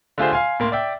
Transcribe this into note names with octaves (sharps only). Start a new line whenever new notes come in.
D3 A3 F4 G4 G#4 C5
F5 G#5 C6
A2 A#3 C6
D5 E5 G5